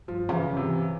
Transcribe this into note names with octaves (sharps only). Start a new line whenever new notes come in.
G2 F3
C#3 E3
C3